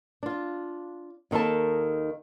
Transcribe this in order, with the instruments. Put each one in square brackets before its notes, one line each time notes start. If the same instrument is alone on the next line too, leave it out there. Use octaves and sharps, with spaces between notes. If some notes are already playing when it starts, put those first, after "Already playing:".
[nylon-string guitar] D4 F4
D#2 D#3 A4 A#4 A5